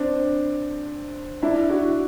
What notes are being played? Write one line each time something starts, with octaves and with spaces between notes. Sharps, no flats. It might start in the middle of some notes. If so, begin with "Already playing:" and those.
Already playing: C4 D4
D4 E4
E4 F#4